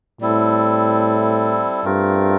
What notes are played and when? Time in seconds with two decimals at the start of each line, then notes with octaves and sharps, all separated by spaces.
0.21 A2 G3 C4 E4 A4
1.85 G2 A3 C4 F4 A#4